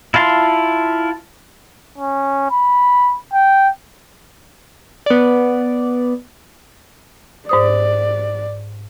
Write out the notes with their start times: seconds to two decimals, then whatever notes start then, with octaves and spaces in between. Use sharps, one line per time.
0.14 E4 F4 A5 C6
1.98 C#4
2.51 B5
3.33 G5
5.06 B3 D5
7.49 G#2 C5 D5 D#6